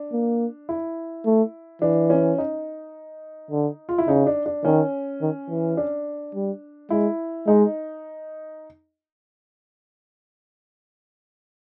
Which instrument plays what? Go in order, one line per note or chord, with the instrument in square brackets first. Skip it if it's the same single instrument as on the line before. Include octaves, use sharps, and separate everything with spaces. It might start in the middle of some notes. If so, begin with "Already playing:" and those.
Already playing: [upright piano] D4
[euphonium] A#3
[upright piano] E4
[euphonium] A3
[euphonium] E3 [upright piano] D4
[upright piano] C#4
D#4
[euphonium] D3
[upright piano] F4
E4
[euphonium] C#3 [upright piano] D#4
[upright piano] D4
D4
[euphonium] D#3 [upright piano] C#4
[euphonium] D#3
E3
[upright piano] D4
[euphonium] G3
[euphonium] G#3 [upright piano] E4
[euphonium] G#3 [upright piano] D#4